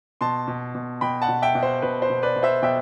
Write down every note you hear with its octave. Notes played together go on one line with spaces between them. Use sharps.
B2 A5 C6
B2
B2
B2 G5 B5
F#5 A5
B2
E5 G5
B2
C5
B2 B4
C5
B2
B4 D5
B2
C5 E5
B2 E5 G5